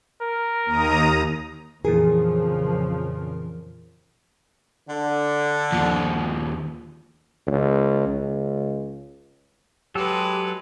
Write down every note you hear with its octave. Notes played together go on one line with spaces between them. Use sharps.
A#4
D#2 A#5 D#6
F2 A#2 C#3 E3 F3 G#4 A#4
D3
D#2 F3
C#2
C#2
F#3 G#3 G4 A4 B4